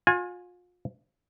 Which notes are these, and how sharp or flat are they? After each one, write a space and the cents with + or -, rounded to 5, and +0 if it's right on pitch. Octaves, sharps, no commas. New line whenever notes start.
F4 +35 G#5 -5